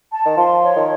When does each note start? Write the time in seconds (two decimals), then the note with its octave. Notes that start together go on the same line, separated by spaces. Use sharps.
0.11 A5
0.26 D#3
0.36 F3 C6
0.63 C#5
0.76 D#3